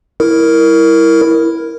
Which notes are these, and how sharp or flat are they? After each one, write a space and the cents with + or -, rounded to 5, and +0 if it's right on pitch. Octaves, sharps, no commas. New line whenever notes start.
E4 +0 A#4 +0